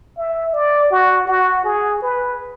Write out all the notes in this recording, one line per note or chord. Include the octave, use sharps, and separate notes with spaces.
E5
D5
F#4
F#4
G#4
B4